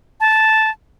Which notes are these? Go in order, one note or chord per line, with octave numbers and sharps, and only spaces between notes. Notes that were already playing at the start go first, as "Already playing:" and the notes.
A5